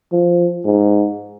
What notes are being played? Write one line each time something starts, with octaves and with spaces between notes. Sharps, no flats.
F3
G#2